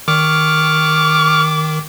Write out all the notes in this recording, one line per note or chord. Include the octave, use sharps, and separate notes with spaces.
D#3 C#6 D6 F6